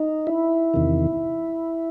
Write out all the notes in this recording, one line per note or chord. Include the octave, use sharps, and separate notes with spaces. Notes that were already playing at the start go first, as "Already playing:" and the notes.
Already playing: D#4
E4
E2 C3 D#3